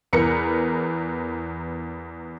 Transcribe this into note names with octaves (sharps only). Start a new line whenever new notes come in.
E2 A#4 B4 C#7